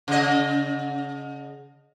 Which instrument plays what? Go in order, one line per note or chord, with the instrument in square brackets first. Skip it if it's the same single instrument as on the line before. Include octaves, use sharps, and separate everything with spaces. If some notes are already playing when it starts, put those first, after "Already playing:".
[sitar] C#3 D#5